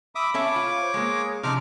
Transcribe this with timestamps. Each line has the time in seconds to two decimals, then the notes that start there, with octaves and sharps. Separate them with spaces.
0.15 E5 B5 D6 D#6
0.34 C#4 A4 C#5 E5 D6
0.56 F4
0.81 C5
0.94 G#3 A#3 G#4
1.43 C3 F3 C#4 D#4 C6 D6 F6